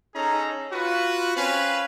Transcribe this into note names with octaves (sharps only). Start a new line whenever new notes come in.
C#4 D#4 G#4 A4 A#5
F4 F#4 B4
C4 C#4 B4 F5 G#5 B5